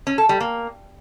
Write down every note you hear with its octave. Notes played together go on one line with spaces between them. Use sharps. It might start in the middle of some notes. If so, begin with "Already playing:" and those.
C#4
A4
G3
A#3